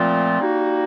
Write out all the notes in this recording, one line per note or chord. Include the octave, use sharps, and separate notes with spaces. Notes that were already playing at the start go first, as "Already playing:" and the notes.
Already playing: A#2 F3 A3 C4 F4
G3 A#3 D#4 F#4